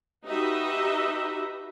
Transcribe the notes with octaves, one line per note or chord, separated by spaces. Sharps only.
D#4 F#4 G4 B4 D#5 E5